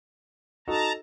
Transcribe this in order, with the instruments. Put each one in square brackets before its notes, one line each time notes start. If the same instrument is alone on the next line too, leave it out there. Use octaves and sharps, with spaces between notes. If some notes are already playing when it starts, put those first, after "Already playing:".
[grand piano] D#4 F#4 A4 [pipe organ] A5 A#5